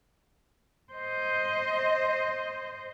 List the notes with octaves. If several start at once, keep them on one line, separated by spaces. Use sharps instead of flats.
C5 D#5